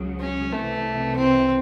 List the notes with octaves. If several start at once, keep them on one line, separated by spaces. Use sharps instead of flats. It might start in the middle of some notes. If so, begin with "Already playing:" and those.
Already playing: C#2 C#3 F#3
C#4
C2 C3 E3 A3
C4